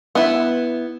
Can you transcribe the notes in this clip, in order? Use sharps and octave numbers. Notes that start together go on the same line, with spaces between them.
B3 E4